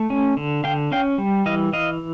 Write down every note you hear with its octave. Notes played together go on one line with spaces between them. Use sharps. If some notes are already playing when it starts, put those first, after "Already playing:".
Already playing: A3
C#4
D3
D3 F5 G5
C#4 F5 G5
G3
E3 D#5 F5
E3 D#5 F5